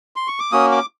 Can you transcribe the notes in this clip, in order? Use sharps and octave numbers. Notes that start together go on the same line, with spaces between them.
C6
C#6
D6
A#3 C#4 F#4 D#6
D6